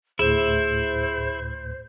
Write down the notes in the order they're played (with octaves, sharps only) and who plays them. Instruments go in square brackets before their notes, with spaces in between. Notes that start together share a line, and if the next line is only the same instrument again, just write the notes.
[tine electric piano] D2 A2 [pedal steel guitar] E4 E5 [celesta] G#4 E7 [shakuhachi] C5